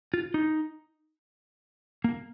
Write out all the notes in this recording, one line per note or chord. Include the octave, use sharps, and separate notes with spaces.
F4
D#4
A#3